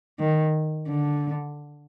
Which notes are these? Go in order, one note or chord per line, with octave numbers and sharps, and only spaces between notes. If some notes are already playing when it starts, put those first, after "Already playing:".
D#3
D3